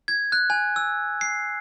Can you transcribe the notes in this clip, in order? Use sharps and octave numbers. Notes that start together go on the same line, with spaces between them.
G#6
F#6
G#5
E6
C7